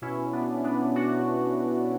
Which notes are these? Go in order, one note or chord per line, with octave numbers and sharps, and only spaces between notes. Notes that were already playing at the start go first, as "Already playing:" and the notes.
B2 C#4 E4
B2
B3 D4
B2
B3 D4
B2
B2 D4 F#4
B2